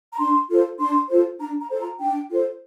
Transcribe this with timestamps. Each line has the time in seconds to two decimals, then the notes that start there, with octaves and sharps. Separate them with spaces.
0.13 A#5
0.19 D4 C6
0.50 F4 A4 C5
0.79 D4 C6
1.09 F4 A4 C5
1.39 D4 A#5
1.60 A#5
1.70 F4 A4 C5
1.80 A#5
2.00 D4 G5
2.30 F4 A4 C5